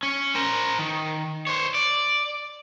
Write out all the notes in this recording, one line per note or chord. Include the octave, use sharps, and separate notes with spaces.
C#4
A#4 C5
D#3
C5 C#5
D5